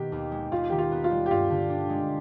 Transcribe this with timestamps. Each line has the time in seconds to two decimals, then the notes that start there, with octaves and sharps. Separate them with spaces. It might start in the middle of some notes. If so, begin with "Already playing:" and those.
Already playing: B2 D#3 B3 G4
0.12 D#2
0.32 G#3
0.52 D#2 F4
0.70 D#3 G4
0.78 F4
0.92 B3
1.04 F4
1.11 G3
1.26 G4
1.31 G2 F4
1.50 D3
1.70 D4
1.89 G#3